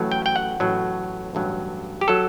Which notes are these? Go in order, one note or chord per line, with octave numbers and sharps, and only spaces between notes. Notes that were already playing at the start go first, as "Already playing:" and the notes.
Already playing: A1 A2 F#3
G5
G5
F#5
A1 A2 F#3
A1 G2 F#3
G4
F#3 A4